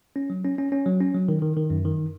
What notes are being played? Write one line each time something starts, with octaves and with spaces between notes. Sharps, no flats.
C#4
F#3
C#4
C#4
C#4
F#3
C#4
F#3
D#3
D#3
D#3
F#2
D#3